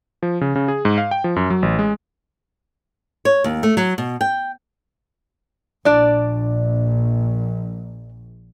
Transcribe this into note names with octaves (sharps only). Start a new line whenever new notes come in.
F3
C#3
C#3
G#4
G#2
F5
G5
F3
F#2
F#3
A1
G#3
C#5
D#2
A3
F#3
B2
G5
A#1 D4 D5